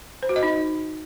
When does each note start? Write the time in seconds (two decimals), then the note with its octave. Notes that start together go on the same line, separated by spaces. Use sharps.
0.23 C5
0.29 F#4
0.36 D#5
0.43 D#4